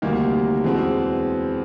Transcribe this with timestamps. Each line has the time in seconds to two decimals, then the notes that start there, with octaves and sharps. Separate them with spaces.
0.02 D2 C3 D#3 G3 A#3
0.64 E2 B2 G#3 C4